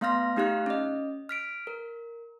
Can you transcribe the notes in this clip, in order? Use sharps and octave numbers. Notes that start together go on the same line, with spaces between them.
A3 B3 F5 C6 F6 A#6
A3 D#4 G4 F5 F6 F#6
C#4 D#5
F6 B6 D7
A#4